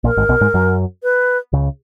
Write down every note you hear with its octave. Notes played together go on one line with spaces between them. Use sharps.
A#1 A#2 A#4
G#1 G#2
B1 B2
G#2 G#3
F#2 F#3
B4
C#2 C#3